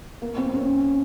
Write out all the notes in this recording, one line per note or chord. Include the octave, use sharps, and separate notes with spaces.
A#3
C4
C#4